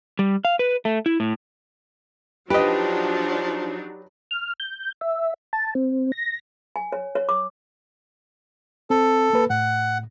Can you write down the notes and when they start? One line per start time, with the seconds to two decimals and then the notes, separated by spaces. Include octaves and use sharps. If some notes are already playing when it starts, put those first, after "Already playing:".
0.19 G3
0.45 F5
0.59 B4
0.85 A3
1.06 E4
1.20 A2
2.50 F3 F#3 D4 D#4 G4 B4 D#5
4.31 F6
4.60 G6
5.01 E5
5.53 A5
5.75 C4
6.12 A#6
6.76 G#5
6.92 C#5
7.15 C#5
7.29 D6
8.90 C4 A4
9.33 A#3 B4
9.50 A2 F#5